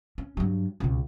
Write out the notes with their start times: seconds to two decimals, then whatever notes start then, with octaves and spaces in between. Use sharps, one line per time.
0.18 C#4
0.37 G2 F#3
0.80 C#2 B2